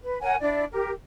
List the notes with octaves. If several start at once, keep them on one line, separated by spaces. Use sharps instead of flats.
B4
A#4 C#5 F#5 G#5
D4 E4 D5
G4 A#4